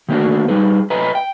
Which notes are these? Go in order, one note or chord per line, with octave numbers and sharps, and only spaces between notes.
D#3 G3 A3 A#3 D4 F#4
G3 D#4 G#4 B4
B4 D#5 E5 G#5 A#5 B5
G5